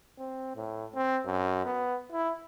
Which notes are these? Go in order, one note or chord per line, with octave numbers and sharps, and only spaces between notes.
C4
A2
C4
F#2
B3
E4